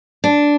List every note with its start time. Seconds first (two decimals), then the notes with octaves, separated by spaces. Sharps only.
0.24 D4